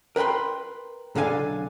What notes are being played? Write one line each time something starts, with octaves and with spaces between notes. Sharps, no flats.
A#4 B4 G5 B5 C6
B1 D3 A4 F5 G#5